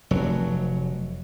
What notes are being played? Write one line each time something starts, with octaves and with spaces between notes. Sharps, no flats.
F1 F#3